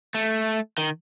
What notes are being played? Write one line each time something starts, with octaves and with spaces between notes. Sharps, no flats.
A3
D#3